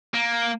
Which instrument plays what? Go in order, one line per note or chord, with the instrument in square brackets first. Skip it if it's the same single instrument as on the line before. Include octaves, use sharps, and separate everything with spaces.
[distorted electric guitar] A#3